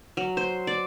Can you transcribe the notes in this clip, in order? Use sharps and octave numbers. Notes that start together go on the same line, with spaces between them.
F#3
C5
D5